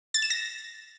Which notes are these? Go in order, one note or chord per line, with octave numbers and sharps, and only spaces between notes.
A6
E7
A#6